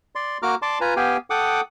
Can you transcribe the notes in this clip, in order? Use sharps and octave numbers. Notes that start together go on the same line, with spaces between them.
D5 C6
A#3 F#4 A#5 D6 F6
D5 A5 C6 D6
F4 B4 G#5 A#5
B3 G4 F5 G5 G#5
A4 F#5 G5 D6 D#6